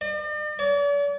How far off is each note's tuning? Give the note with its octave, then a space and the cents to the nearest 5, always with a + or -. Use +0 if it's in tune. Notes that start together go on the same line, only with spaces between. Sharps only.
D5 +45
D5 -45